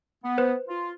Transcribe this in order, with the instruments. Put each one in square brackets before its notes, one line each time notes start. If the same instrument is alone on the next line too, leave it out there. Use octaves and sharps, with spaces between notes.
[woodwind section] B3
[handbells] B4 C5
[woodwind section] F4